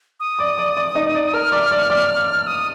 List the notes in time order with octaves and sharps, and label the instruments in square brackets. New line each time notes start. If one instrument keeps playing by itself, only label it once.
[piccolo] D#6
[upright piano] D5 D6
D5 D6
D5 D6
D#4 D#5
D5
[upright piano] A#4 A#5 [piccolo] F6
[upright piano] D5 D6
D5 D6
D5 D6
[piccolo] D#6